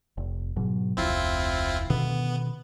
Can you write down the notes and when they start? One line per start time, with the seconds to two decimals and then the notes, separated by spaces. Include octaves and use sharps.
0.17 F1
0.56 G#2 B2 F#3
0.97 F1 D2 C4 E4 F4
1.90 B2 D3 D#3 B3